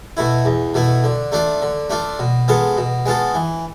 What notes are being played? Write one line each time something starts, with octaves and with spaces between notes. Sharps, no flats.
B2 A3 E4
E2
B2 A3 E4
D3
A3 D4 F4
D3
A3 D4 F4
B2
G#3 B3 F4 A4
B2
G#3 B3 F4 A4
E3